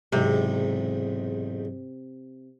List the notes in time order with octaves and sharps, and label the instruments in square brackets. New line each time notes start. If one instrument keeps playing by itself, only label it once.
[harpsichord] B1 E2 G#2 [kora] C3